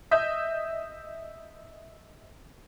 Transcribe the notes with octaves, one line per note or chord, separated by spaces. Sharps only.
D#5 E5 D#6 G6